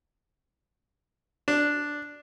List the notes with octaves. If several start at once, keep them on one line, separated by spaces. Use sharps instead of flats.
D4